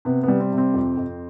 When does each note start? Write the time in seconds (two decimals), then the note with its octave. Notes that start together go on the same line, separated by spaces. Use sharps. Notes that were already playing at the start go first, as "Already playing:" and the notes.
0.05 C3 B3
0.23 G3 B3
0.40 C4
0.52 C3
0.58 C4
0.74 F2
0.97 F2